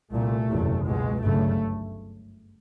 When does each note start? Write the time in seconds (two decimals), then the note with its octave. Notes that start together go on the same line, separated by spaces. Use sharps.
0.12 C2 A#2 A3
0.49 F#1 E2 C3
0.86 C#2 B2 G#3
1.23 G1 F#2 C#3 A3